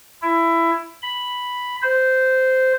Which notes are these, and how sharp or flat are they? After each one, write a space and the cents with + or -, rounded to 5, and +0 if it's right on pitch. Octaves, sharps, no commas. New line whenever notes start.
E4 +15
B5 +0
C5 -10